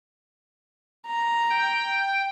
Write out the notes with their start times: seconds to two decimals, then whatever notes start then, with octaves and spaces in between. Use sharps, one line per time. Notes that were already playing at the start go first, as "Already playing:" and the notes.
1.07 A#5
1.50 G5 G6